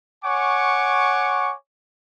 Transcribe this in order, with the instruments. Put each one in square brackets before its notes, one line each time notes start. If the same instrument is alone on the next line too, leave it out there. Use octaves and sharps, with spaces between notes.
[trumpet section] C#5 F#5 G#5 C#6 D6